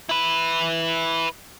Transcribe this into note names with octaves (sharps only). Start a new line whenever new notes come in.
E4 B4